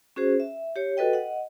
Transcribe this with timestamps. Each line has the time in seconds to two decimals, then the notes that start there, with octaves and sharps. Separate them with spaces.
0.16 C#4 F#4 G#4 C5
0.40 E5
0.76 G4 C#5
0.97 F#4 A4 B4 D#5 G5
1.13 D#5 F#5